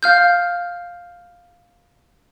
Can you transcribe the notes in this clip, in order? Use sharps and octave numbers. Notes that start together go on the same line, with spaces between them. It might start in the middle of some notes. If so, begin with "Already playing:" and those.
F5 F6 G6